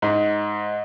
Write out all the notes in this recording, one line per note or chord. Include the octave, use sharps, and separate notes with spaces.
G#2